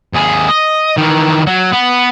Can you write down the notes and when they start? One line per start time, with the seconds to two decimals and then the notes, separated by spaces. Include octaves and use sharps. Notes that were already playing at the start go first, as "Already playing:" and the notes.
0.15 D#2 G#4
0.49 D#5
0.97 D#3 E3
1.47 F#3
1.72 B3